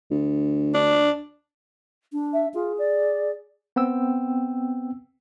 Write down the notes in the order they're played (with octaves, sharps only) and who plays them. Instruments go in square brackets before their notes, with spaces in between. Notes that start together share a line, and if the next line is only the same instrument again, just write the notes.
[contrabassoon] D2
[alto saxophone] D4
[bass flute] D4
[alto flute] E5
[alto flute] F4 [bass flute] G#4
[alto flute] D5
[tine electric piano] B3 C4 G5 E6